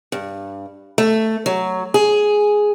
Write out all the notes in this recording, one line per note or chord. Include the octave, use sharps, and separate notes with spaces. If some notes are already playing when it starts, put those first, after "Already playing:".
G2
A3
F#3
G#4